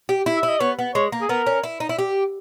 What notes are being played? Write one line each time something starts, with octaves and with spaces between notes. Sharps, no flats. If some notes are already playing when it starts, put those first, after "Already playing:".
G4
E4
E5
E4
D#5
B3 C#5
B3
G#3 C#5
A#3
G#4
B3 A#4
C#4
E4
D#4
E4
G4